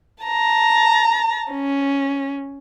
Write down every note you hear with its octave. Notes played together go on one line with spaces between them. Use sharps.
A5 A#5
C#4